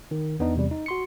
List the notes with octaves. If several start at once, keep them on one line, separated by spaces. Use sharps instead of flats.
D#3
E2 B3 D4 D#4
E2 C3 G3
D#4
F#4 C6 C#7